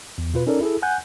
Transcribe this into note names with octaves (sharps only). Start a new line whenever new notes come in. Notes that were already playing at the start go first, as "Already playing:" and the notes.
E2
B2 F4 B4
C#4 D#4 A4 A#4 D5
E4 G#4 A4
F#5 G#5 F#6 G6